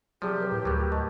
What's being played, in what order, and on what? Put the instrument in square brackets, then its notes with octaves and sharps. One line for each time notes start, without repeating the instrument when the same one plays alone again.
[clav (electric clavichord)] C3 F3 [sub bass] F#3 [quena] G4 [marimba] G#4 D5
[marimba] A#4 B4
[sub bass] A2
[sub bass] D2 [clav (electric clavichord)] F#3 G3
[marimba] D#5 A5 C#6